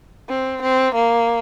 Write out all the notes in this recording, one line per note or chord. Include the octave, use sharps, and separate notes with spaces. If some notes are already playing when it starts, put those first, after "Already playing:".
C4
C4
A#3